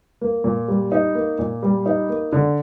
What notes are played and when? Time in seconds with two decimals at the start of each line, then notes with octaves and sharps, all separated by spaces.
0.21 A#3
0.44 A#2
0.68 G3
0.92 D#4
1.15 A#3
1.39 A#2
1.63 G3
1.86 D#4
2.09 A#3
2.32 D3